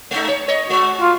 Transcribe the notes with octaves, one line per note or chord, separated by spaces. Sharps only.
G#3 A3 D#4
C#5
C#5 D#5
G#3 F#4
F4